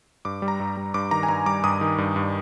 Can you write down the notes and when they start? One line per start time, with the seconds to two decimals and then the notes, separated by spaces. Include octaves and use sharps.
0.25 G2 D6
0.42 G3
0.48 A#5
0.60 G2
0.77 G3
0.94 G2 D6
1.11 D#3 A#5
1.23 G#5
1.28 G2 A#5
1.46 G3 D6
1.64 G2 D#6
1.81 D#3
1.98 G2
2.16 G2